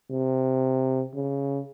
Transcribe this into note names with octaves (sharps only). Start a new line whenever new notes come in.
C3
C#3